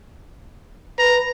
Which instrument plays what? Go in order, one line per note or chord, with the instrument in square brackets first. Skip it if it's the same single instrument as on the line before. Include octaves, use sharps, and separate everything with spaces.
[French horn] B4 [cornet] A#5